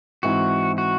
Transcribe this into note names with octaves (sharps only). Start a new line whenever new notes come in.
G#2 E3 C4 E4 F#4
F#4